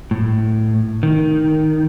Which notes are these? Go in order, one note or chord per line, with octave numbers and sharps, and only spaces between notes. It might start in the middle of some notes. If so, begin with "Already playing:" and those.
A2
D#3